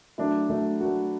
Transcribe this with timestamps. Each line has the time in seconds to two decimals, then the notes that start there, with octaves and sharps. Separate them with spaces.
0.18 F#3 A3 D4 E4
0.49 F#3 A3 D4
0.80 F#3 A3 D4 F#4